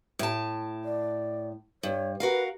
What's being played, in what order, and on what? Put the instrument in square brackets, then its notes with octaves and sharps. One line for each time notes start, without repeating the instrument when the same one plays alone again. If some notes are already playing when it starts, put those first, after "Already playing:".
[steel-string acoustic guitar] A2 A5
[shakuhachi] D5
[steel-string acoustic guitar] G2 [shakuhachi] C#5
[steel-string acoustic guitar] F#4 A#4 F5 [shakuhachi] B4